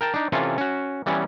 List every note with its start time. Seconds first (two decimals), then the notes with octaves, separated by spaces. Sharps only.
0.01 A#4 G5 A5
0.14 D4 D#4
0.32 C3 E3 C#4 F4 A4
0.58 C#4 F#4
1.06 E3 G3 B3 C#4